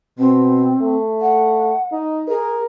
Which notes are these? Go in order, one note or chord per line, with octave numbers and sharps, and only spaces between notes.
B2 C4
A3
F#5
D#4
G#4 A#4